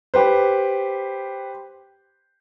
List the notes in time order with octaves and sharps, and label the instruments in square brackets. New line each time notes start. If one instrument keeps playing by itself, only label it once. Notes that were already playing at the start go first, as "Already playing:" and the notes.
[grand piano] G4 B4 C5